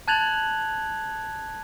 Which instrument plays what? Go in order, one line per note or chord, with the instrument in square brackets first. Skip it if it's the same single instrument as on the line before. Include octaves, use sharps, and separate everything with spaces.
[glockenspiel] A5 F#6 G#6 A6 F7 F#7